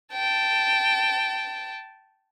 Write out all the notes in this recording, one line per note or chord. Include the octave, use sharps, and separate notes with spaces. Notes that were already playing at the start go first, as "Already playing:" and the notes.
G5 A5